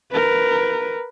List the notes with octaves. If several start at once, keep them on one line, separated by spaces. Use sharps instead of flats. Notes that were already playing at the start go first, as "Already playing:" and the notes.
A#4 B4